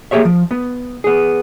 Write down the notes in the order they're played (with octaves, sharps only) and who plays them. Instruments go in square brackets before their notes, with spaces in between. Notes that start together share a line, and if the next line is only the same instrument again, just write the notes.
[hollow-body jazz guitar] A#3 G4 G#4 C#5 E5
F3
B3
B3 G#4